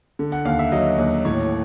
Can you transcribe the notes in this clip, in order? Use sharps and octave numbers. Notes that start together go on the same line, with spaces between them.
D3
F#5
D#2 F5
E5
F#3 D#5
D#2
A2 C#5